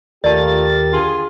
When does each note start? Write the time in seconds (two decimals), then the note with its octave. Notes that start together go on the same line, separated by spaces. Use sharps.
0.24 D#2 A3 F4 G4 A#4 D5 A5 A6
0.91 D3 F4 G#4